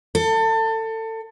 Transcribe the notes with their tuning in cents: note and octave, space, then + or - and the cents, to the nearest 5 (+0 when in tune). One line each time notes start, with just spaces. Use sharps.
A4 +25